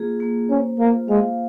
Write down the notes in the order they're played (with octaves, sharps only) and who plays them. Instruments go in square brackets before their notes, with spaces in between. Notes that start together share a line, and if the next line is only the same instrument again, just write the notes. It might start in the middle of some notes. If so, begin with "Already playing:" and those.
Already playing: [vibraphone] A#3 F4 G#4
A#3
[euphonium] C#4 [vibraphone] C5
[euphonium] A#3 [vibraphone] F4
[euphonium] G#3 [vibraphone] F5